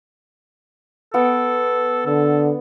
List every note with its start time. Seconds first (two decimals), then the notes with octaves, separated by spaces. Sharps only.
1.14 B3 A4 F#5 G5
2.07 D3 A4